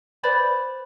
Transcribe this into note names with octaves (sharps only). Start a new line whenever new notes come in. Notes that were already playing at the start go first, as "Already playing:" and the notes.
B4 C5 D5 B5